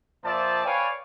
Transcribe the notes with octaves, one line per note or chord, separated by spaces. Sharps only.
A#2 F3 C5 D5 E5 A5
B4 C#5 D5 F5 G5 G#5